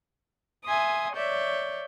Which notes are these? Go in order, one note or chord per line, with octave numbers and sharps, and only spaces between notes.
E5 G#5 C6 D#6
C#5 D5 E5 G6